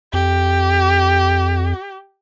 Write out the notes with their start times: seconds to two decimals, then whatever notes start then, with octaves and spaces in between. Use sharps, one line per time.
0.13 F2 G4